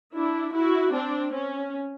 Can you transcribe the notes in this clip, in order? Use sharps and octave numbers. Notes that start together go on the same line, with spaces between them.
D4 E4
E4 F#4
C4 D4
C#4